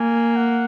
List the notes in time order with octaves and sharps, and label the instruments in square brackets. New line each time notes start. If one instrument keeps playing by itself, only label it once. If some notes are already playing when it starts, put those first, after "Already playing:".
Already playing: [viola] A#3 [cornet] G#5
[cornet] F#5